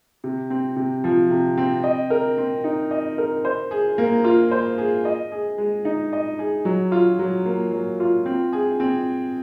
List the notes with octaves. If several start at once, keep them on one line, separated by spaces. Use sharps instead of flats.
C3
C4
C3
F3
C3
C4
D#5
A#4
C4
D#4
D#5
A#4
C5
G#4
A#3
F4
C5
G#4
D#5
G#4
G#3
D#4
D#5
G#4
F#3
F4
F#3
A#3
F#3
F4
C4
G#4
C4